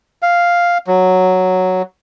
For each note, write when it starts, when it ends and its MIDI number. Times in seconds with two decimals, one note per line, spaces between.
0.22 0.78 77
0.87 1.82 54